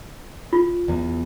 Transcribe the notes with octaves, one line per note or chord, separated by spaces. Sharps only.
F4
E2